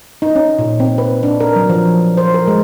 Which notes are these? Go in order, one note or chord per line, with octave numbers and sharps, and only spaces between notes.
D#4
C#4
A#2
C4
B4
D4
A#4
F#3
F3
C5
A#4
G#3